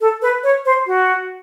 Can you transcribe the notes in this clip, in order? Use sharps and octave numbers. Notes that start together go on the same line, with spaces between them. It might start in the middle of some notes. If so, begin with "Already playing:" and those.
A4
B4
C#5
C5
F#4